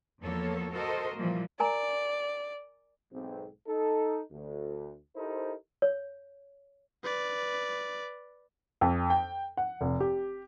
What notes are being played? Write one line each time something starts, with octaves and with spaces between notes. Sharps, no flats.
E2 F3 A#3 B3 A4 C#5
F#4 A4 A#4 C5 D#5
A#2 E3 F3 G3 A#3
A#4 D5 G#5 A#5
B1 G#2 C4
D#4 A4
D2
D#4 E4 G4 A4 A#4 C5
C#5
B4 D5
F2
G5
F#5
F1
G4